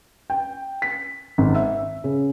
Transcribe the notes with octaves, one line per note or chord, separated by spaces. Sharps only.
G5
B6
G#1
E5
C#3